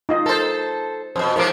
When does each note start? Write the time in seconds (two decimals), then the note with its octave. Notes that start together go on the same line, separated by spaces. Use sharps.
0.09 D#4 F4 D#5
0.26 A4 A#4 C5 A5
1.16 F2 B2 C5
1.36 G#2 C3 F3 A#4 C5 D6